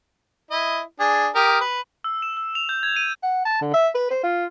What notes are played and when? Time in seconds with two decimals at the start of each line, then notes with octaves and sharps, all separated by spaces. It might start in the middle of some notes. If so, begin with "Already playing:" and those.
0.51 E4 D#5
1.00 D4 G#4
1.35 G4 A#4 D#6
1.61 B4
2.04 E6
2.22 E7
2.37 E6
2.55 F7
2.69 G6
2.83 G#6
2.96 D#7
3.22 F#5
3.46 A5
3.61 D3
3.74 E5
3.95 B4
4.10 C5
4.23 F4